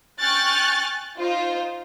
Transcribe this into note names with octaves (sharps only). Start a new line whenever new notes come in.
G5 G#5 C#6 F6 F#6 A6
D#4 F4 C5